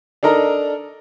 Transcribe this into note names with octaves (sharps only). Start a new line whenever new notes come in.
D4 A4 A#4 D#5 A#5